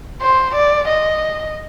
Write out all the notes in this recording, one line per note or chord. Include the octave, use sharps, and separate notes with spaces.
C5
D5
D#5